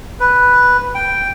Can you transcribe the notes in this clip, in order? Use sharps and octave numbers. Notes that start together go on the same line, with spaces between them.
B4
G5